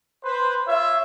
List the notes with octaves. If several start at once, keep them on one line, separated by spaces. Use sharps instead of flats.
B4 C5
F4 C#5 E5